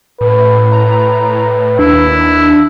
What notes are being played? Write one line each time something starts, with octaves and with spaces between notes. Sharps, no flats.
A2 B4
A#5
D#2 D4 E4